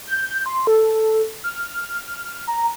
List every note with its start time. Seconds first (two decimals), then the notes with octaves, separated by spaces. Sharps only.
0.07 G6
0.46 C6
0.67 A4
1.44 F6
2.48 A#5